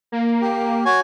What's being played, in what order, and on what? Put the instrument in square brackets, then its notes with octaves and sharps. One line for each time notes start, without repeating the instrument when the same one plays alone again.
[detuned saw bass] A#3
[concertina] G4
F#4 C#5 G#5